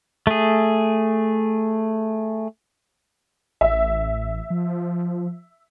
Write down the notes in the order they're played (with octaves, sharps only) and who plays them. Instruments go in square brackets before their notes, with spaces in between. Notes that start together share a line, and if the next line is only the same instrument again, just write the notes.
[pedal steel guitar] A3 G#4
[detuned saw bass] A1 [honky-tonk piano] E5
[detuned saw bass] F3